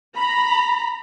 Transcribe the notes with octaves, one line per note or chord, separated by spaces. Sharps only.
A#5 B5